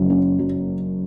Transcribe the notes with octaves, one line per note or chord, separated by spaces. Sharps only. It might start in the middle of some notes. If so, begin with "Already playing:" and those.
Already playing: F#1 F#2
C#4
F#3